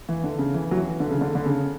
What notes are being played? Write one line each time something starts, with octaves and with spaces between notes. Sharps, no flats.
E3
D3
C#3
E3
F#3
E3
D3
C#3
D3
D3
C#3